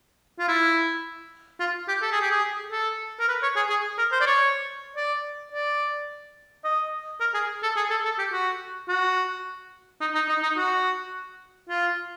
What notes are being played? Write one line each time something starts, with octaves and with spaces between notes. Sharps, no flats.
F4
E4
F4
G4
A4
G#4
G4
G#4
A4
A#4
B4
C#5
G#4
G#4
A#4
C5
D5
C#5
D5
D5
D#5
A#4
G#4
A4
G#4
A4
A4
G4
F#4
F#4
D#4
D#4
D#4
D#4
F#4
F4